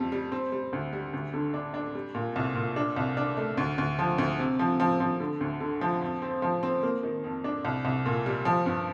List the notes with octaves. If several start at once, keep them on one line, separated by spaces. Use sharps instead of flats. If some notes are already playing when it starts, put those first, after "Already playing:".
Already playing: F2 G3
G3
C4
G3
D2
G3
D2
D3
D4
D4
G3
A#2
C2
A#2
D4
C2
D4
A3
D2
D2
F3
D2
C3
F3
F3
F3
D3
D2
D3
F3
F2
C4
F3
C4
A#3
D#3
F2
D4
C2
C2
A#2
G3
F3
G2